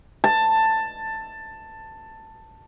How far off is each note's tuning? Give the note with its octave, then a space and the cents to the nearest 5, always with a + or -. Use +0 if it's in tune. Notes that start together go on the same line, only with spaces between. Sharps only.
A5 +10